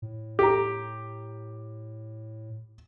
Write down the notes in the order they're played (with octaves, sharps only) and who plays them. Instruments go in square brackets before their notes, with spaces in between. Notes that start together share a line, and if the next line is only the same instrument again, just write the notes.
[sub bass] A2
[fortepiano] G4 A#5